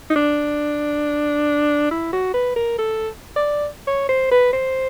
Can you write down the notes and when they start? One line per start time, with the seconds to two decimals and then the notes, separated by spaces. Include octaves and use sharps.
0.10 D#4
0.16 D4
1.91 E4
2.13 F#4
2.34 B4
2.56 A#4
2.78 A4
3.36 D5
3.87 C#5
4.09 C5
4.31 B4
4.53 C5